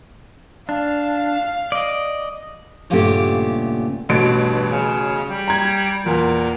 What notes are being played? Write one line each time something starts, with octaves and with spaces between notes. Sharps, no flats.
D4 F5
D5 D#5
G2 A#2 C#3 A3 B3 G4
A1 G2 B2 D7
C#3
G3
A#5 G#6
E2 A#2